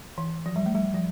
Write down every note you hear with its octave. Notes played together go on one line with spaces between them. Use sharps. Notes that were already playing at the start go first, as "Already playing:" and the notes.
E3
F3
G3
A3
G3
F3